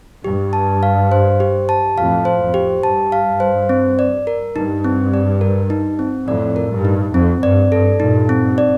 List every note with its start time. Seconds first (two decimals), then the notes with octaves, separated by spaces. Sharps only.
0.24 G2 G4
0.53 A5
0.83 F5
1.12 C5
1.40 G4
1.69 A5
1.97 F2 A2 F5
2.25 C5
2.41 F2
2.54 G4
2.83 G2 A5
3.12 F5
3.40 C5
3.69 C4
3.99 D5
4.27 A#4
4.55 G2 D#4
4.84 C4
5.14 D5
5.41 A#4
5.70 D#4
5.99 C4
6.28 F2 A2 D5
6.56 A#4
6.71 G2
6.85 D#4
7.14 F2 C4
7.42 G2 D5
7.72 G2 A4
8.00 G2 A#2 D#4
8.29 C4
8.43 G2
8.58 D5